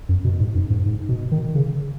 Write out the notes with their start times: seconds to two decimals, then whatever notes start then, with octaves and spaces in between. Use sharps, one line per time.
0.09 F#2
0.24 B2
0.40 G#2
0.55 F#2
0.70 G#2
0.86 G#2
1.09 B2
1.32 D#3
1.55 C#3